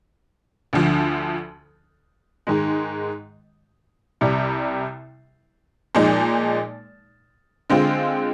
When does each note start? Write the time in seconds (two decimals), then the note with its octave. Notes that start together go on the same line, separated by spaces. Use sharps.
0.73 D2 D3 F3
2.47 G#2 D#3 G#3
4.21 C2 C3 G3
5.95 A#2 F3 G#3 D#4
7.70 D3 G#3 C4 F4